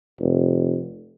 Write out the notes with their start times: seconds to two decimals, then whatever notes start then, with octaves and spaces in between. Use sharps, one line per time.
0.20 F1